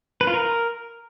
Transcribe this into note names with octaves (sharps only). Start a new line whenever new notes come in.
B4
F4
A#4